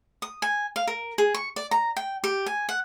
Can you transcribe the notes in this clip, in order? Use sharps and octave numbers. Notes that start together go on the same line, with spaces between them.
D#6
G#5
F5
A#4
G#4
C#6
D5
A#5
G5
G4
G#5
F#5